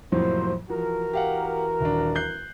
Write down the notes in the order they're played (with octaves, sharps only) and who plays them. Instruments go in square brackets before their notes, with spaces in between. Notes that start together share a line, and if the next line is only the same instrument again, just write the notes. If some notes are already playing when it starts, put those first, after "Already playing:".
[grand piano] F2 A2 F#3 [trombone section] C3 A#3 C5
[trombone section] E3 F#4 A#4 [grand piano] F3
[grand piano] G4 F5 F#5
D#1 D4
F#6 G6 C7